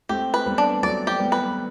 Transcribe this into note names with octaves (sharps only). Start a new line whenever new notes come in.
A3 C4 G4
B4
G3 B3
D4
F#3 A3 D5
G4
G3 B3
B4